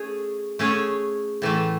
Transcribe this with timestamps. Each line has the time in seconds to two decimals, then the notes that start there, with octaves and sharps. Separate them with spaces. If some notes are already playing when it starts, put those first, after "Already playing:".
Already playing: A3 C#4 G#4 C#5
0.59 A3 C#4 G#4 C#5
1.42 A2 E3 A3